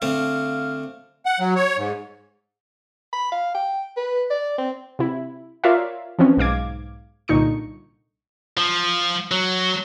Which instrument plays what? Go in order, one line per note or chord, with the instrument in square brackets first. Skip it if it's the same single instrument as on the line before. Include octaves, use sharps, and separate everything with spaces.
[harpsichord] D3 A3 C4 [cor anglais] F5
[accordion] F#5
F#3
C#5
G#2
[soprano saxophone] B5
F5
G5
B4
D5
C4
[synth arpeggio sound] C3 E4
F4 A#4 C#5 D5 E5 F5
E3 F3 C4 C#4
B1 G#2 F5 D6 G#6
C2 A#2 D3 D#4 C#6 C#7
[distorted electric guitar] F3
F#3